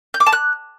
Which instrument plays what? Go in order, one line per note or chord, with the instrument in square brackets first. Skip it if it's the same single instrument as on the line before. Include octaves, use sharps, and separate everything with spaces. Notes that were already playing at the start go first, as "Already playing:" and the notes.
[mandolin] G6
D6
A5
F#6